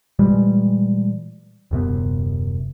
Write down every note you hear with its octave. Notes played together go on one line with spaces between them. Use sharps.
A#2 E3 G3 G#3
D#1 F#2 C3 B3